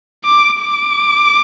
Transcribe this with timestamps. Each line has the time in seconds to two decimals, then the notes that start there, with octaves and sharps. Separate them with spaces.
0.24 D6
0.61 D6